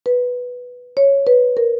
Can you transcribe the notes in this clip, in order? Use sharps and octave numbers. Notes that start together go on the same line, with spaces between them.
B4
C#5
B4
A#4